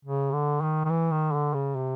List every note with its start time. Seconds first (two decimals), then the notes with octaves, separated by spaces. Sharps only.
0.05 C#3
0.33 D3
0.61 D#3
0.85 D#3
0.90 E3
1.11 D#3
1.33 D3
1.54 C#3
1.75 C3